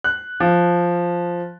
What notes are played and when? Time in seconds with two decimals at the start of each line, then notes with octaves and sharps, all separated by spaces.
0.04 F#6
0.40 F3